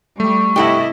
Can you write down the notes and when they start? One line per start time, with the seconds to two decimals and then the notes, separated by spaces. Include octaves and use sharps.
0.20 G3 A3 C#6
0.56 C3 E4 G4 A4 D#5 F#5